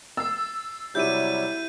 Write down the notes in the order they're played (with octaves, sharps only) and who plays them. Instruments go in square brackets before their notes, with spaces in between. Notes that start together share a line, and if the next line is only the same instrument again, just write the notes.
[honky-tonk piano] E6 [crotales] A6 C7
[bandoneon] C3 F#3 G3 [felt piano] E4 G4 [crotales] G6 D#7